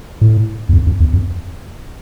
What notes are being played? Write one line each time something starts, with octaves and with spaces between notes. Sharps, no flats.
A2
E2
F2
F2
E2
F2